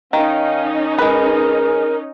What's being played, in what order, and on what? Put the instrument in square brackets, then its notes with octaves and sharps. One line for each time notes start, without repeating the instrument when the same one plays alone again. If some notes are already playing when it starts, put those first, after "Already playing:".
[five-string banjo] D#3 [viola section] C#4 D#4 [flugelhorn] F5
[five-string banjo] G#3 B4 [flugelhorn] G#4 [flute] A#4